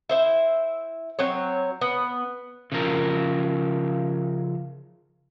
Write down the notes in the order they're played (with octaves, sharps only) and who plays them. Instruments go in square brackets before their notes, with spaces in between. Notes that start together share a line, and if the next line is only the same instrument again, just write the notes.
[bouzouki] E4 C5 E5
F#3 C4 C#5
B3
[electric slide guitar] C#3 F3 A#4